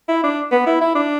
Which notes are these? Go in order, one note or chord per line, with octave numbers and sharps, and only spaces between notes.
E4
D4
B3
E4
E4
D4